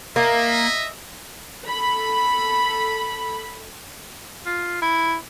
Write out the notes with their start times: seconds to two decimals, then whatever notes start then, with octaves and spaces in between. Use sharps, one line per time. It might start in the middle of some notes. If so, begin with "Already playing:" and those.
0.16 A#3 D#5 E5
1.65 A4 B5
4.46 F4
4.82 E4